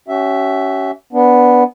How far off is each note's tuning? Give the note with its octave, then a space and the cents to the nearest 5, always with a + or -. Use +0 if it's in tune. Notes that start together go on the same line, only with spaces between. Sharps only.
C#4 +10 F#4 +45 E5 +0
B3 +0 D4 -10